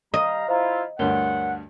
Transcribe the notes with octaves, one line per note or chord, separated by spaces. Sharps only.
G3 D#5 F5 A#5
E4 F4 C5 F5 A#5
D2 G2 A#4 C#5 F#5 G7